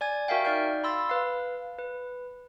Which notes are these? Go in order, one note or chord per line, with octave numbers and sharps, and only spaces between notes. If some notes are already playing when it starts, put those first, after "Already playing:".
D5 G#5 G#6
F#4 A#4 E5 F5 G5
D#4 D5 F5 F6 G6
B5 C6 E6 A6
B4 F5
B4